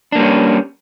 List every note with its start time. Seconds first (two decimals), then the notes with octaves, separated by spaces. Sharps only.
0.12 D4
0.15 A#3
0.18 G3
0.21 C#4